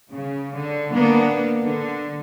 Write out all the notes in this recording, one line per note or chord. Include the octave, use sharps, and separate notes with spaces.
C#3
D3
A#3 B3 D4
D3